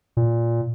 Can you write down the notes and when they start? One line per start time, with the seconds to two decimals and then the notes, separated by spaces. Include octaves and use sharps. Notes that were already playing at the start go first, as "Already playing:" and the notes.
0.17 A#2